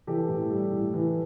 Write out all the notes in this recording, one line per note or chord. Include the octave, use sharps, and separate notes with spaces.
E3 G4 A4
A2
G3
A2
E3